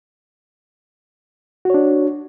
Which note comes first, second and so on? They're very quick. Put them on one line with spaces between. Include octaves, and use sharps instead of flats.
F#4 C#5 D4